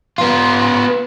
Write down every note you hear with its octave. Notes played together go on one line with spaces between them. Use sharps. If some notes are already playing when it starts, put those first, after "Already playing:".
B3 F4